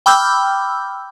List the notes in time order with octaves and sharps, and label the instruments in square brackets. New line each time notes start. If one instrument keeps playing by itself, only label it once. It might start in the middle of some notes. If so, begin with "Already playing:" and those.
[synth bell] G5 B5 D6 E6 F6 G6